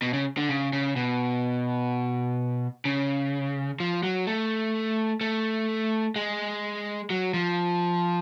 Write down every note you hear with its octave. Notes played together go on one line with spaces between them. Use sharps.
B2
C#3
D3
C#3
C#3
B2
C#3
F3
F#3
A3
A3
G#3
F#3
F3